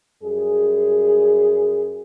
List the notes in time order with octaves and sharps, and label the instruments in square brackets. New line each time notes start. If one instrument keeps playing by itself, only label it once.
[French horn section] F#2 G3 G#4